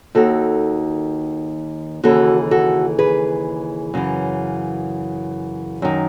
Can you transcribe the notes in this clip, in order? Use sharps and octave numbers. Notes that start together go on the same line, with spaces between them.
D#2 D#3 F#4 A4
D#2 C#3 E3 F#4 A4
F#4 A4
G#4 B4
F#2 C#3 E3
F#2 D#3